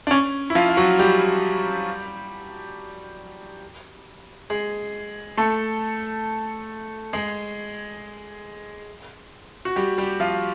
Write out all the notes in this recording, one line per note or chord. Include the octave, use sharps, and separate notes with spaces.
D4
C#4
E4
F3 F4
F4
F#3 F#4
G3 G4
G#3 G#4
A3 A4
G#3 G#4
F#4
G3 G4
G3 G4
F3 F4